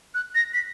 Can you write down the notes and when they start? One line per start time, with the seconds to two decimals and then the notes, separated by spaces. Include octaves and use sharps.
0.14 F#6
0.35 A#6
0.54 B6